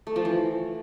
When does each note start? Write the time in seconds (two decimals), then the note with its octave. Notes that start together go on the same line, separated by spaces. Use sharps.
0.07 A3
0.16 F3
0.25 E3